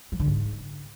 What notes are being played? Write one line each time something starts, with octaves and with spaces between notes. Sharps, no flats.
F3
D3
G#2